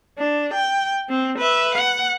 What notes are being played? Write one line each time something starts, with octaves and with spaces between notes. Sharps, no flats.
D4
G5
C4
B4 E5
F#5